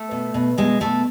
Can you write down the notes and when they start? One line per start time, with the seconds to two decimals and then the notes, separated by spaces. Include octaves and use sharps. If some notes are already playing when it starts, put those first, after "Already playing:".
Already playing: A3
0.11 B2
0.34 B2
0.58 B2 G#3
0.80 B2 A3